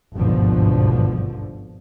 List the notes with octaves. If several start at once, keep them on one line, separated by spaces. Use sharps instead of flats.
G#1 D2 G2 B2 D3 F3